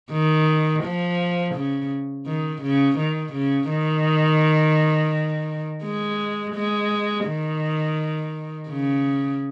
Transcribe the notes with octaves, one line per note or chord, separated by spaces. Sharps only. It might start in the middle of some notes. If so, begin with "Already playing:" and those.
D#3
F3
C#3
D#3
C#3
D#3
C#3
D#3
G#3
G#3
D#3
C#3